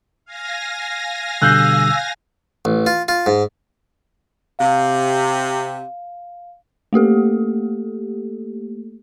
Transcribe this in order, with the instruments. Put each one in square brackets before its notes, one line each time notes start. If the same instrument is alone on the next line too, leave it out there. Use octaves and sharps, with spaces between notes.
[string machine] F5 G#5 A#6
[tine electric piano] B2 D3 G3 [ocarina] E6 [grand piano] F#6 G6 C7
[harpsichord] A1
F4
F4
G#2
[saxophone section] C3 [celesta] F5
[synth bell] A3 A#3 G4 A4